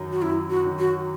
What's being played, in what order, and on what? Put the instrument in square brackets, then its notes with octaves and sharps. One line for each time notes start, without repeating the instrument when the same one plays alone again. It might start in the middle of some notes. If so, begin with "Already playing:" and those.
Already playing: [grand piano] F#2 D#3 F#3
[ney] F#4
[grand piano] F#2 [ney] E4
[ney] F#4
[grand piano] D#3 F#3
[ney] F#4